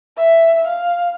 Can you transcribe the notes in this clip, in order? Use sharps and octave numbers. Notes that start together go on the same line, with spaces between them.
E5
F5